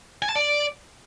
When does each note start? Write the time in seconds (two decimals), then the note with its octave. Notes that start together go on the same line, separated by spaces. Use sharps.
0.22 G#5
0.29 A5
0.36 D5